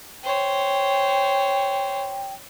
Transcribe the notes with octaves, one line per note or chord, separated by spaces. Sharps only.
C5 C#5 G5